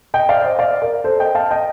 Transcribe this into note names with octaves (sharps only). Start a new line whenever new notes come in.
D#5 G5
D5 F5
C5 D#5
D5 F5
A#4 D5
A4 C5
D#5 G5
F5 A5
D#5 G5